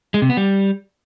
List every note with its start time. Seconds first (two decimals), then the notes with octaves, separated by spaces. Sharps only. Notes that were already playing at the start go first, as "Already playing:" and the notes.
0.14 G#3
0.22 C3
0.29 B3
0.37 G3